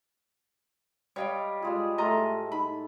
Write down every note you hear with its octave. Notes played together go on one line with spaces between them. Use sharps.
G3 C#5 D#5 F5 G5
G3 G#3 F4 G#4
A2 A3 F4 A4 D#5 A#5
D#4 B5